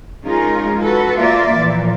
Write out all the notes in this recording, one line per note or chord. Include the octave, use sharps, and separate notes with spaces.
G#3 C#4 D#4 F4 G#4 A#4
F#4 A4 B4
A#3 F4 D5 E5
A#2 E3 F3 A#3